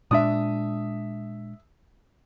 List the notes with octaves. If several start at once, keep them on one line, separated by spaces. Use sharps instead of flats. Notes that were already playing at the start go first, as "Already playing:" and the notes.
A#2 G#3 D4 E5 D#6